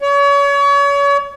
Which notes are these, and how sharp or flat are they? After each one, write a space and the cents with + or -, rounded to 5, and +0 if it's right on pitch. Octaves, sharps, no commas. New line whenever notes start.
C#5 +35